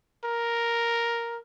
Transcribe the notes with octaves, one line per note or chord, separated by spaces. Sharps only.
A#4